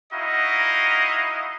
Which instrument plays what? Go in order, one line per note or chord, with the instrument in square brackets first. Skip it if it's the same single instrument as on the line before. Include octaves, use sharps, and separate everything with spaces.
[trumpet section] D#4 E4 F#4 D#5 F5